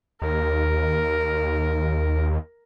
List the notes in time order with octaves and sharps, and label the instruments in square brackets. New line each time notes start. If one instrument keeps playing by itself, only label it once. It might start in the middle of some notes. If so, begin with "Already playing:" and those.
[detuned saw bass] D#2 [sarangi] A#4